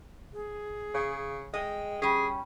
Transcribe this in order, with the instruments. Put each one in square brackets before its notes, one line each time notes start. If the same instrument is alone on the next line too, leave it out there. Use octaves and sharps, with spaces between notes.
[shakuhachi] G#4
[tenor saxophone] C#3
[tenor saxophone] G#3 [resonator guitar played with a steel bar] D#5 [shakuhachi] G5
[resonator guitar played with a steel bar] G3 C#4 [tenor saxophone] G#4